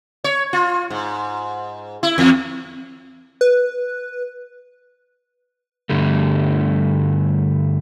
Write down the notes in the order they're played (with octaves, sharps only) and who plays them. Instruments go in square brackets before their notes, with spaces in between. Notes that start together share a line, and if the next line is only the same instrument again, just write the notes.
[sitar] C#5
F4
G#2
E4
E2
[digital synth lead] B4
[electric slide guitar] G2 D3 G3 A3